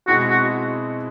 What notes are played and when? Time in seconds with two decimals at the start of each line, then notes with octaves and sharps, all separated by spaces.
0.07 B2 G#3 C4 E4 F#4 G#4
0.30 F#4